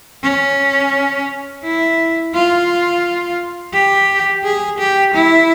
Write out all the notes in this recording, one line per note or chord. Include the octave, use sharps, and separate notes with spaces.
C#4
E4
F4
G4
G#4
G4
E4